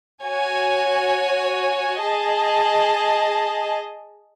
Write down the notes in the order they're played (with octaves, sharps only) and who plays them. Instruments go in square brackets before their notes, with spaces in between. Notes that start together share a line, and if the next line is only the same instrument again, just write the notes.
[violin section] F#4 C#5 G#5
G#4 D#5 A5